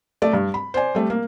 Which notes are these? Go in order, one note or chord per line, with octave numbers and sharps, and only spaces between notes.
A3 D5
G2
B5
C5 D5 G#5
G3 A3
A#3